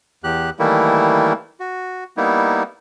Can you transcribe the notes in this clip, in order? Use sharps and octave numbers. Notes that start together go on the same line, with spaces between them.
E2 G4 F#6
D#3 E3 G3 A3 A#3 E4
F#4
G3 A#3 B3 D#4 E4